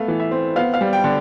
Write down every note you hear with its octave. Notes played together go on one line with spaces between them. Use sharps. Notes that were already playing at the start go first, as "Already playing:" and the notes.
Already playing: A3 B3 F5
E3
E5
C4
B3 F5
F5
G3
G5
D3